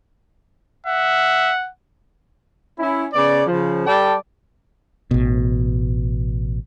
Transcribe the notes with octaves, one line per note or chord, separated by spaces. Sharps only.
E5 F#5
C#4 E4
C#3 B3 D5
C#3 F3
G3 A4 D5 G5 A5
A1 B2